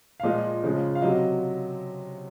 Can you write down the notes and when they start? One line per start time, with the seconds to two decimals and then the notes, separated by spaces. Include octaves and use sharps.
0.20 F5
0.23 A#2 F3 G#3 D#5
0.63 C#3 F3 G#3
0.95 F5
1.02 C3 F#3 D#5